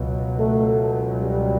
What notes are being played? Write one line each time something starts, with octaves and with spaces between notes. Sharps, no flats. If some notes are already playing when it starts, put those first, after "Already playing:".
Already playing: C#2 B2 F#3
A3
G3